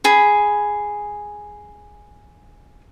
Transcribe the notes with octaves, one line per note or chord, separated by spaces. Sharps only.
G#4 B5